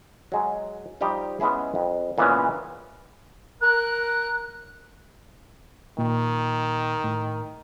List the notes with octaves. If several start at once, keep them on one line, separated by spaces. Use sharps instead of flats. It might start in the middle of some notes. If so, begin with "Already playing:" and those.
F#3 G#3
F3 G3 D#4 G4 D#5
G#3 B3 C#4 E4 G#4
F2
A#2 C#3 E3 G#3 B3 C#4
A#4 F#6
A#2 D#3
A2